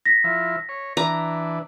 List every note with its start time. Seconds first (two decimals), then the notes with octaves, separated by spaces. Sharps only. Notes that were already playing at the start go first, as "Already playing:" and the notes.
0.06 A#6 B6
0.24 F3 E4
0.69 C#5
0.97 E3 D4 B4 A#5